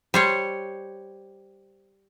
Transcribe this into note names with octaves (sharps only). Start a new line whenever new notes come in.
G3 C5 C#5